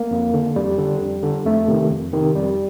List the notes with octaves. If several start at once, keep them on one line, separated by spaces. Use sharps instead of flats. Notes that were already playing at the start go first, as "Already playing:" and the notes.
Already playing: A#3
F2
D3
F2 G3
D3
F2
D3
F2 A3
C3 D#3
F2
C3 D#3
F2 G3